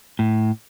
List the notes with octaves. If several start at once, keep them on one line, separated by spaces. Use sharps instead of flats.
A2